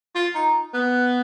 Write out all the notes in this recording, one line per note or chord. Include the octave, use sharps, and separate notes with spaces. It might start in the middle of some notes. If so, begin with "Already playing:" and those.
F4
D#4
B3